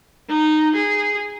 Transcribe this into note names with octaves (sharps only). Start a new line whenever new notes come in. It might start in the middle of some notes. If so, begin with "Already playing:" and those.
D#4
G#4